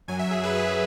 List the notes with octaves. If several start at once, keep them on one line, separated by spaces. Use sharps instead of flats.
F#2 F#3 G#5
E5
G#4
F#2 F#3 B4
G#4
B4